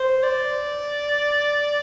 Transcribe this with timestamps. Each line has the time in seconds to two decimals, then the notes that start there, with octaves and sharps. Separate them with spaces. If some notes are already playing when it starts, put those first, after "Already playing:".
Already playing: C5
0.23 D5